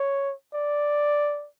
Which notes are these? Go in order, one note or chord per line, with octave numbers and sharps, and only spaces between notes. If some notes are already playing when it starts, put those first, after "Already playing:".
Already playing: C#5
D5